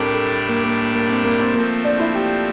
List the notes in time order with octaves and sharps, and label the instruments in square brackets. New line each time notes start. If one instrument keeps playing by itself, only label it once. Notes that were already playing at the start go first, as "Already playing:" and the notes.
Already playing: [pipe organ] A2 G3 D4 [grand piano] C4 A4 A#4
[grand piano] A4
A#3
A#3
A#3
C4
A#3
C4
[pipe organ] F3 A3 C4 [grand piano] A#3
[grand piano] D4
E4
G4